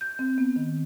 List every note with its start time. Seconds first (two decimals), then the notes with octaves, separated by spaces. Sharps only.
0.01 G6
0.19 C4
0.38 B3
0.56 D#3